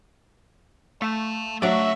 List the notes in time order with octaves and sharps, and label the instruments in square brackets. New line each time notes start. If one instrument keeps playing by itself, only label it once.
[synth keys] A3 [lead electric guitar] F5 A5
[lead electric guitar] C#3 F#4 [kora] F#3 D4 D5 [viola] E5